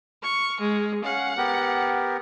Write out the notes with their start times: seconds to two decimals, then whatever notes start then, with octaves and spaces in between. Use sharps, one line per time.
0.23 C#6 F6
0.61 G#3
1.04 C#4 F5 F#5
1.37 B3 G4 A#4